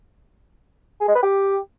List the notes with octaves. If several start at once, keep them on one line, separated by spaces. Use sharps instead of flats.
G#4
G#3
B4
G4